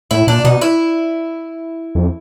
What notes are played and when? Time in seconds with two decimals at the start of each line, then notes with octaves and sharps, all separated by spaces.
0.11 A2 E4
0.27 A#2 D4
0.44 B2 D#4
0.61 E4
1.95 F2